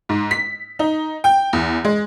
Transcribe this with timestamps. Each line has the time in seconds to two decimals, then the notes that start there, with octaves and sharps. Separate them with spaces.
0.09 G#2
0.31 B6
0.79 D#4
1.24 G5
1.53 E2
1.85 G#3